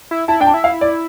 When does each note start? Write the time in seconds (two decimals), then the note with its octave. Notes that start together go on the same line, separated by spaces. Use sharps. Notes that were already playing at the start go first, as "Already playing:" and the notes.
0.11 E4
0.28 E4 A5
0.40 D4 G5
0.46 A5
0.54 E4
0.64 F5
0.81 D5